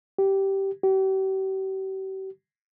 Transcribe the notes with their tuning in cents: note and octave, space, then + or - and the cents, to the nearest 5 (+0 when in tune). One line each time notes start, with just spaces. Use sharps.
G4 -10
G4 -40